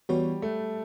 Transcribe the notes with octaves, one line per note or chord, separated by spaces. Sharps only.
E3 G3 B3 F#4 C#5
A3